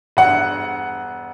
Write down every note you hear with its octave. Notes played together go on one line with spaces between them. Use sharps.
E1 G2 F#5